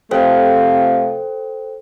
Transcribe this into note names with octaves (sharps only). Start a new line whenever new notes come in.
C3 F3 A3 A4 C5 G5